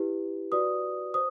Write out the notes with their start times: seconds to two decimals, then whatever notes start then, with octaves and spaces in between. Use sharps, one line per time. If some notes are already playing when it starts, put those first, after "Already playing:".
Already playing: E4 G4 B4
0.52 F#4 B4 D5 D#6
1.14 C5 D#6